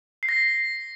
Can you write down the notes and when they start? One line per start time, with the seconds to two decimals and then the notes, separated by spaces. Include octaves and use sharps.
0.23 C7
0.29 A#6